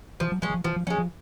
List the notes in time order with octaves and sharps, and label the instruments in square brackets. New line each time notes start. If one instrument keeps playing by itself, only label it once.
[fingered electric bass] E3 [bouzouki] F3
[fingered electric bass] F#3
[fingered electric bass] F3 [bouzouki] G#3 C#4
[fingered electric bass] E3
F3
[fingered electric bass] E3 [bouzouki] F3
[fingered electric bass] F3
[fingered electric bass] F3 [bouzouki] C#4
[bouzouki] G#3
[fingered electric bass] F3